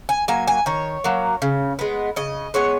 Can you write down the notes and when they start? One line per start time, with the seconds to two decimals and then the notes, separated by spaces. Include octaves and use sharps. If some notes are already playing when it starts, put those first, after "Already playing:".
0.09 G#5
0.28 F#3 A#3 G#5
0.47 G#5
0.66 D#3 C#5
1.04 F#3 A#3
1.42 C#3
1.79 G#3 B3
2.16 C#3 D#5
2.54 G#3 B3 C#5